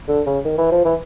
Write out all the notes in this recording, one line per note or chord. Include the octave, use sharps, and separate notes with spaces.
D3
C#3
D#3
E3
F3
E3